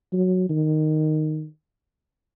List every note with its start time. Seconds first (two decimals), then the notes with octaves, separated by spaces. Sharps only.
0.13 F#3
0.49 D#3